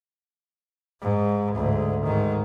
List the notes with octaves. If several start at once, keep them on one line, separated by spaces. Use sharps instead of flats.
G#2
D2 G#2
G#2 D#3